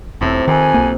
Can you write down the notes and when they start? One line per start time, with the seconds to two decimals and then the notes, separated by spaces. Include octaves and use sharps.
0.21 E1 A2 C3 C4
0.48 F2 D#3 G#5
0.74 B1 A#3